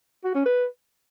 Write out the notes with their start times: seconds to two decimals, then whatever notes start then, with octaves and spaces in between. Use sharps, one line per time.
0.24 F#4
0.35 C#4
0.45 B4